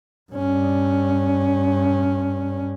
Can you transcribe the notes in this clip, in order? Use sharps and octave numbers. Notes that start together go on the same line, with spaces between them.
G2 C#4